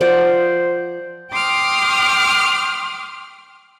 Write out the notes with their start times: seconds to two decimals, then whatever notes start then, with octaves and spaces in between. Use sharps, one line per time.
0.01 F3 C5 D5 F#5
1.31 G5 C6 D6 D#6 F6